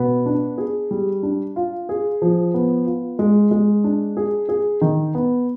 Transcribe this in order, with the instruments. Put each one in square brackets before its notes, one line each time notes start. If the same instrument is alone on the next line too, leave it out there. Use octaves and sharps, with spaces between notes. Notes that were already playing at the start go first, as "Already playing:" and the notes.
Already playing: [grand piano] B2 B3
D4
G#4
G3
D4
F4
G#4
F3
B3
F4
G#3
G#3
D4
G#4
G#4
D#3
B3